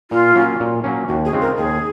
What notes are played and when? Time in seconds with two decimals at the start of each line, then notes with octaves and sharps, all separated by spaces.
0.11 A#2 F4
0.35 F#3 A#3 C#4
0.60 A#2
0.84 F#3 A#3 C#4
1.08 D#2 F#4
1.25 G#4
1.33 C#3 G#3 C4 F4
1.42 A#4
1.57 D#2 G#4